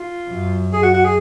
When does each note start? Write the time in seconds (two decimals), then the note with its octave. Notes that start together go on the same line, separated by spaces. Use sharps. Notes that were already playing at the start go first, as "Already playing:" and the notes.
Already playing: F4
0.30 F#2
0.73 G#4
0.83 F#4
0.94 F#4
1.05 G#4